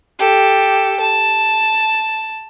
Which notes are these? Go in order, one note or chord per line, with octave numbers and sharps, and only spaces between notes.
G4 A4
A5